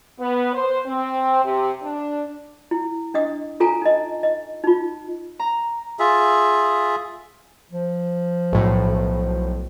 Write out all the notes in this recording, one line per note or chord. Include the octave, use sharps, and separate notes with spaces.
B3
C5
C4
C3
D4
E4
D4 D#5 D#6
F4 A4 G#5 A#5
D#4 D#5
D#5
D#4 F4
A#5
F4 G#4 E5
F3
B1 A2